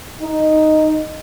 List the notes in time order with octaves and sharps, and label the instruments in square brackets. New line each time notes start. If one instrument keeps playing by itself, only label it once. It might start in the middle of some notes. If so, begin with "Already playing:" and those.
[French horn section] D#4